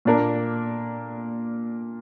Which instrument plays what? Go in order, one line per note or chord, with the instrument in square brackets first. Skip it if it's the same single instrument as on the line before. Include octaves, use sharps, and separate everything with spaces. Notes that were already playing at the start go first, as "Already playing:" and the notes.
[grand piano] A#2 A#3 D4 A#4